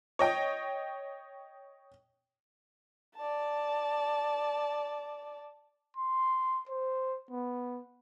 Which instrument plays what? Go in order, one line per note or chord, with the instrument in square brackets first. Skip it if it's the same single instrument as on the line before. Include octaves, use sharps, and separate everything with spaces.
[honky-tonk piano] C#5 D#5 G5
[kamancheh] D5 A5
[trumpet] C6
C5
B3